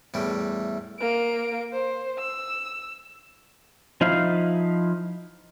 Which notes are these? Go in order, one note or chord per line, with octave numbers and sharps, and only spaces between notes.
E2 A2 G3
A#3 D7
C5
E6
F3 D#4 E4 F5